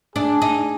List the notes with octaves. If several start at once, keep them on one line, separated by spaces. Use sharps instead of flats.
D4 G#4
D#4